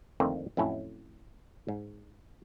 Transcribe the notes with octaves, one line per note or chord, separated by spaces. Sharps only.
F2 D3 D#3 A3 A#3 C4
F2 A2 F#3 C#4 E4
G#2